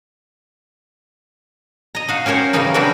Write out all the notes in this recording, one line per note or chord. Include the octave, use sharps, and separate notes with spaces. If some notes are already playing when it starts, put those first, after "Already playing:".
D#5 A#5
D#4 F#4 F5
C#4 G4 A#4 C5 C#5
C#3 E3 G3 C#4 D#4 A#4
E3 F#3 C4 D4 G4 A#4